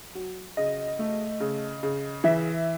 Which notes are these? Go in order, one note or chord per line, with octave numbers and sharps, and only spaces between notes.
F#3
C#3 D#5
A3
C#3
C#3
E3 E5